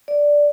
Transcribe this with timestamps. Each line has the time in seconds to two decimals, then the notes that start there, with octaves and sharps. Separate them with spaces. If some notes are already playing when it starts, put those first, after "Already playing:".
0.08 D5